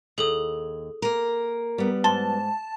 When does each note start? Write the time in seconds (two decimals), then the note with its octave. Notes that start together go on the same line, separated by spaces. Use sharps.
0.18 D#2 G#4 A4 D#6
1.02 A#3 A#4
1.78 G3 B3
2.04 G#2 A5 C6